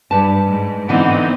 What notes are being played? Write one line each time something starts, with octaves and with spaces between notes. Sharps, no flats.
G2 G3 B4 A5
G#2
D3 E3 B3 C4 D#4